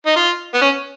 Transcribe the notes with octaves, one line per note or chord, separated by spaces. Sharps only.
D#4
F4
B3
C#4